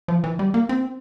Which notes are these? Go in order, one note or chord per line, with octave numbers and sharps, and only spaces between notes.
F3
E3
G3
A#3
C4